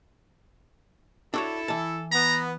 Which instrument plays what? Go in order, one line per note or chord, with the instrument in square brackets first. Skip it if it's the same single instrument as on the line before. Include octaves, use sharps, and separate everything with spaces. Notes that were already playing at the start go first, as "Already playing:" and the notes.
[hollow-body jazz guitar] D4 F#4 C#5 [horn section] E4 A4
[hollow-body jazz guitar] E3 A5
[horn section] B3 [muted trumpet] A#5